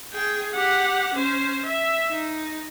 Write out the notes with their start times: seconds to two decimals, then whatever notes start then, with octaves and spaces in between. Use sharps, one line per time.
0.13 G#4 G5
0.52 G4 F#5
1.14 C#4 C5
1.66 E5
2.10 D#4